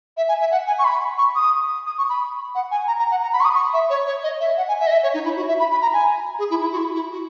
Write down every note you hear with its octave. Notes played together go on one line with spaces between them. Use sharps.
E5
G#5
E5
F#5
G#5
C#6
B5
C#6
D#6
D#6
C#6
B5
F#5
G#5
A#5
A#5
F#5
A#5
B5
C#6
D#6
C#6
E5
C#5
C#5
D#5
E5
F#5
G#5
E5
D#5
E5
C#5
D#4
E4
F#4
E5
B5
B5
A#5
G#5
G#4
E4
E4
F#4
E4
E4
F#4